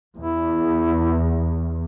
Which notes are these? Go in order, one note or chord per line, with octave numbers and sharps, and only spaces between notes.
E2 E4